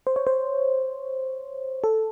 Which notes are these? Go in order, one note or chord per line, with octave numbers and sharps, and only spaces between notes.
C5
C#5
C5
A4